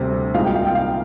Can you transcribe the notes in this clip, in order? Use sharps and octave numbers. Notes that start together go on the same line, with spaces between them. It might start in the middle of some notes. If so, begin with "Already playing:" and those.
Already playing: D2 C3 G3 C4
C2 A#2 G#3 D#4 F5
G5
F5
G5
F5